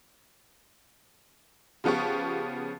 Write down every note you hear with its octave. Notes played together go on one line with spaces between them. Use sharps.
C#3 F3 B3 G4 C#6